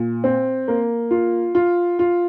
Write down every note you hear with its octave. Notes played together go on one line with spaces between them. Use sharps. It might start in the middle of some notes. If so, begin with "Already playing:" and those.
Already playing: A#2
C4
A#3
F4
F4
F4